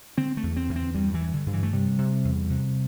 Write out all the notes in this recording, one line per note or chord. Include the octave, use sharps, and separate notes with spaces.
D3 C4
A3
E2
C4
E2
C4
G2 G3
E3
G2
D3
G2
E3
A3
C3 G3
C3
E2
C3